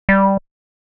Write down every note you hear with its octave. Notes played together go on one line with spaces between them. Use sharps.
G3